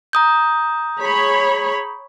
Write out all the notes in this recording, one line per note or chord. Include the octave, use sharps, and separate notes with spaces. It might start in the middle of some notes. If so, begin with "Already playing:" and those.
A#5 D#6 G6
G#4 C#5 B5